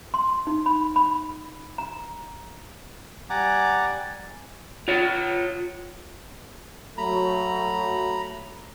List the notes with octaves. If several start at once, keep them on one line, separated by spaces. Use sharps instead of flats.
C6
D#4
B5
B5
A#5
G3 D5 F#5 G#5 A#5 D6
F4 C#5
F#3 A3 A#5 B5